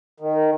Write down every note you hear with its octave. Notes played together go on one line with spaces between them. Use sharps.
D#3